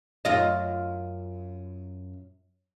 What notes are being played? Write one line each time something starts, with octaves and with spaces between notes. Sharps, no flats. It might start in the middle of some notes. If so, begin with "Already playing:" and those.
F#2 F4 D#5